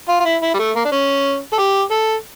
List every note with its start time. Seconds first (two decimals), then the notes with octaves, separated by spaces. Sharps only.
0.08 F4
0.20 F4
0.25 E4
0.42 E4
0.54 G3
0.59 A3
0.75 A#3
0.85 D4
0.91 C#4
1.52 A4
1.58 G4
1.91 A4